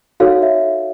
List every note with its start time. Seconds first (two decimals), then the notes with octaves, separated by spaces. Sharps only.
0.20 D#4 F#4 A4 C#5 F5
0.42 E5